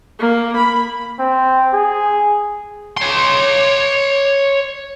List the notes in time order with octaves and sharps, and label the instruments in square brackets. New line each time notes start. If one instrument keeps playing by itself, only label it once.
[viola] A#3
B5
[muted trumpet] C4
G#4
[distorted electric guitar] C#5 C6